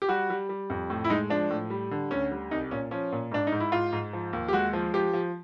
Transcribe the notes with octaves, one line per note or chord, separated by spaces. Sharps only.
G4
G3 F#4
G3
G3
F2
A2
E4
G#3 D#4
F3 D4
A2
G3
D3
D2 C#4
G3
C2 D#4
A#2 C#4
F3 C#4
A#2
G#2 D4
D#4
G#2
E4
G#2 F4
G#2
F3
D#2
G4
G#3 F#4
F3
F3 G4
F3